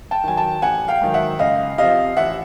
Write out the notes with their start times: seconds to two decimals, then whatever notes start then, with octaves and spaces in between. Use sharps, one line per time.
0.11 G5 A5
0.24 D#3 F#3 G#5
0.37 G5 A5
0.62 A1 F#5 G#5
0.88 F5 G5
1.01 G#2 D#3 F#3
1.14 E5 F#5
1.39 C#2 D#5 F5
1.78 C3 F3 D#5 F5
2.17 A1 E5 F#5